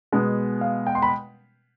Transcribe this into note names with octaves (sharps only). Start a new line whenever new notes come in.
B2 G#3 B3
F5
G5
C6
B5